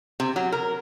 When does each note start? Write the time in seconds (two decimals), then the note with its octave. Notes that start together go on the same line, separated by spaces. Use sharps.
0.20 C3
0.36 F#3
0.52 A#4